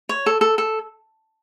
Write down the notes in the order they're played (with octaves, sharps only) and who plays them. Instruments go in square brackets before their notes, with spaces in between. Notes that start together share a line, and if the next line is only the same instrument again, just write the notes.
[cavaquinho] C#5
A4
A4
A4